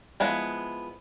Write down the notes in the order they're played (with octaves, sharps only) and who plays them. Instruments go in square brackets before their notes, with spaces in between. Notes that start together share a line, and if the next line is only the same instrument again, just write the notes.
[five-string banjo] F3 G#3 B3 E4